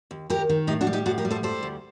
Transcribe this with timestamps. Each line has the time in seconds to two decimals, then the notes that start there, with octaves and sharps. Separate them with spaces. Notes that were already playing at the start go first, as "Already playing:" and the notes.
0.11 D#2
0.30 D#2 G4 A#4
0.49 D#3
0.67 A2 D#4 G4
0.81 D4 F#4
0.87 G3
0.93 D#4 G4
1.06 A2 F#4 A4
1.18 G4 A#4
1.25 G3
1.31 A4 C5
1.43 G3 A4 C5
1.63 D2